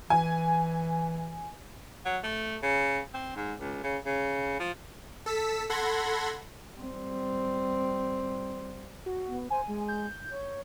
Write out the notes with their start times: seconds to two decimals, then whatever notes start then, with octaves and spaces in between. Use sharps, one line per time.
0.10 E3 G#5
2.06 F#3
2.24 A3
2.63 C#3
3.14 C4
3.36 G#2
3.60 C#2
3.84 C#3
4.06 C#3
4.60 F3
5.26 A4 E6 B6
5.70 A4 F#5 B5 C6 G#6 A#6
6.77 G3 C4
9.06 F#4
9.27 B3
9.50 C5 G#5
9.67 G#3
9.88 G6
10.31 C#5